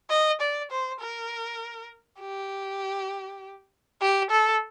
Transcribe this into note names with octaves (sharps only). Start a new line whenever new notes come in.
D#5
D5
C5
A#4
G4
G4
A4